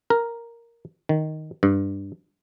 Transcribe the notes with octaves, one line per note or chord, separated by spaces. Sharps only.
A#4
D#3
G2